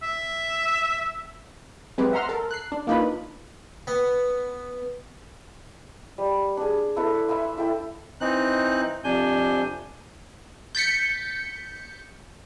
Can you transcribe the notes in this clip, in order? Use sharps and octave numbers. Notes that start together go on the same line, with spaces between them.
E5
F#3 G#3 C4 G4 B4
E5 F#5 A#5 C6 F6
A4 A#4
F#6 C7
D4
A#3 D4 D#4 F4 B4 B5
B3
G3
D4 G#4
E4 A4 B4 E5
E5 G#5 B5 C6
E4 A4 G5
E3 C4 D#4 F#6
F2 C3 D4 G#5 G6
G6 A6 B6 C#7